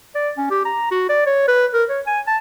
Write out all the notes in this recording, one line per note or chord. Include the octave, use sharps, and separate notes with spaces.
D5
C#4
G4
A#5
F#4
D5
C#5
B4
A#4
C#5
G#5
A5